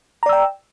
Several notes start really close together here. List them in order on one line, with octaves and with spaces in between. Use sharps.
A#5 D5 E6 G5